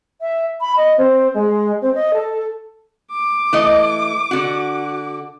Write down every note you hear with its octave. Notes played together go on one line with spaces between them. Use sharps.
E5
B5
D#5
C4
G#3
C4
D#5
A4
D6
E3 A3 D#5
D3 F#4